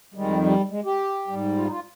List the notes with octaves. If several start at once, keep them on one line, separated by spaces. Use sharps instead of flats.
F2 D#3 G3 G#3
G3
G#3
G4
G#2 G3
F4
D#4
F4